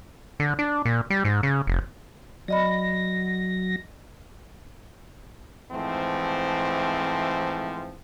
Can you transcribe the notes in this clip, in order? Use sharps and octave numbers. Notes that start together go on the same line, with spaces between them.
D3
D4
A#2
G3
G#2
C#3
F1
F#3 D5 D#5 B5 A#6
G#2 E3 F3 A3 C4